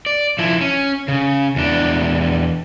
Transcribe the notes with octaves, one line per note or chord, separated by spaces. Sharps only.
D5
F3 E4
C#4
C#3
E2 D4